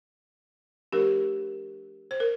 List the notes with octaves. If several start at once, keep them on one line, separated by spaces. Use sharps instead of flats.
F3 A3 D4 G4 A#4
C5
A#4